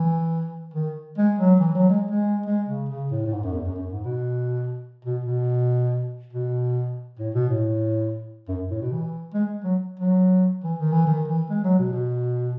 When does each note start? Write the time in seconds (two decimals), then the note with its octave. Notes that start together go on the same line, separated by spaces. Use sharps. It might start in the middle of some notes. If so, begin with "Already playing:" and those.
Already playing: E3
0.74 D#3
1.18 G#3
1.39 F#3
1.60 E3
1.75 F#3
1.89 G#3
2.11 G#3
2.46 G#3
2.69 C#3
2.89 C#3
3.11 A2
3.26 A2
3.33 G#2
3.43 F#2
3.54 E2
3.65 F#2
3.76 F#2
3.90 G#2
4.04 B2
5.05 B2
5.26 B2
6.33 B2
7.19 A2
7.35 B2
7.49 A2
8.48 F#2
8.70 A2
8.82 B2
8.92 E3
9.34 G#3
9.64 F#3
10.00 F#3
10.64 E3
10.79 D#3
10.92 E3
11.07 D#3
11.28 E3
11.50 G#3
11.64 F#3
11.79 B2
11.93 B2